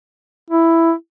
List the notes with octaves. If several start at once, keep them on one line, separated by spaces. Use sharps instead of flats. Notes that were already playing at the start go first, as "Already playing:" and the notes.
E4